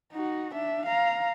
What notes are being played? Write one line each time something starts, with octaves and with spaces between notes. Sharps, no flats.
D#4 F#4
D4 E5
F5 A#5